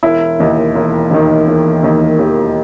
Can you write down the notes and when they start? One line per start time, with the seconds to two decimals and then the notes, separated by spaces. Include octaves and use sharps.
0.03 E1 E4
0.39 D#2 D#3
0.75 E1
1.11 D#2 D#3
1.47 E1
1.83 D#2 D#3
2.19 E1 G4